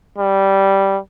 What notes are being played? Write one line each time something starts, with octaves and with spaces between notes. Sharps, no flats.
G3